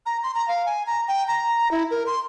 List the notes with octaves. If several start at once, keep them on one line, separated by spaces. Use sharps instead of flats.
A#5
C6
A#5
F5
G#5
A#5
G5
A#5
E4
A#4
C6